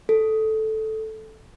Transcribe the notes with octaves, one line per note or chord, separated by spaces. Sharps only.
A4